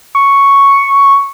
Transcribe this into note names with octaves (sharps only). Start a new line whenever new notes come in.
C#6